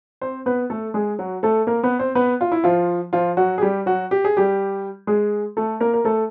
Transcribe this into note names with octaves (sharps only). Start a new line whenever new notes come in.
C4 C5
B3 B4
A3 A4
G#3 G#4
F#3 F#4
A3 A4
A#3 A#4
B3 B4
C4 C5
B3 B4
F4
E4
F3 F4
F3 F4
F#3 F#4
G#4
G3 G4
F#3 F#4
G4
G#4
G3 G4
G#3 G#4
A3 A4
A#3 A#4
A#4
A3 A4